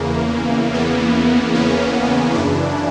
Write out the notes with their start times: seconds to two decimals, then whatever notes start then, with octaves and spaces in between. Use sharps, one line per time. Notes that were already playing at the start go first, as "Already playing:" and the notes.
Already playing: E2 C#3 E3 A#3
0.74 B3
1.55 C#4
2.34 F#2 C#3 E3 D4